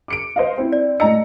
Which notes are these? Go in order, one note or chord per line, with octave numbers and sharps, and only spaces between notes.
D6 C#7 D7
C5 D#5 F5
C4 E4
D5
A2 D4 D#5 A#5 E6 C#7